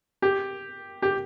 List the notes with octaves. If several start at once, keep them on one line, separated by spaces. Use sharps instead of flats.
G4
G4